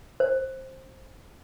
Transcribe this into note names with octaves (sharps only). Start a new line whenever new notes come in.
C5